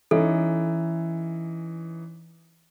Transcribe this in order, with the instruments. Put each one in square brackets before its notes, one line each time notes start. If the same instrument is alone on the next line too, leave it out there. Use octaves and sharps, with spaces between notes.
[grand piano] E3 C#4 D#4 [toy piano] A4